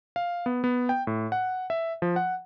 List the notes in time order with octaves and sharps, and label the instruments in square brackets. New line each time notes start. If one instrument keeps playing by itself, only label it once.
[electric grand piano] F5
B3
B3
G5
A2
F#5
E5
F3
F#5